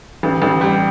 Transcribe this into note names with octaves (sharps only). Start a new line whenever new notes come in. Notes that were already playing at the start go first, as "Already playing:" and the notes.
A1
A1
G3